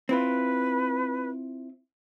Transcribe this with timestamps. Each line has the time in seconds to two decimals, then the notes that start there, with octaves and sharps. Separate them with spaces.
0.09 C4 E4 F4 B4